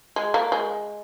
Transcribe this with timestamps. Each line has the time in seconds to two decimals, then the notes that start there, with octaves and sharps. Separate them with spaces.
0.16 G#3
0.34 A#3
0.52 G#3